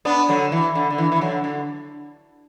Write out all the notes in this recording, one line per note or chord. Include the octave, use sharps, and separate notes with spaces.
B3 D4
D3 F#3
E3
D3
D3
E3
E3
D3 F#3
D3